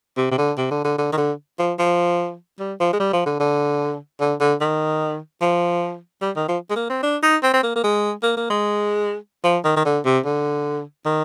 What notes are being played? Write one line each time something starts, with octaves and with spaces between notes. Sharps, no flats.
C3
C3
D3
C3
D3
D3
D3
D#3
D3
F3
F3
G3
F3
G#3
G3
F3
D3
D3
D3
D3
D#3
F3
G3
D#3
F3
G#3
A#3
C4
D4
D#4
C4
C4
A#3
A#3
G#3
A#3
A#3
G#3
F3
D#3
D#3
D3
C3
D3
D#3